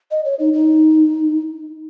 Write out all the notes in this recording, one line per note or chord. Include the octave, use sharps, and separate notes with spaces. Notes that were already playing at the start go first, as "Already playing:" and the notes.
D#5
C#5
D#4
D#4